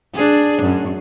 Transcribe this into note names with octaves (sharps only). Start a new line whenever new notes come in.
D4 G#4
F#2